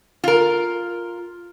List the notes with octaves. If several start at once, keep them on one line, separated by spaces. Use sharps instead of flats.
F4 A#4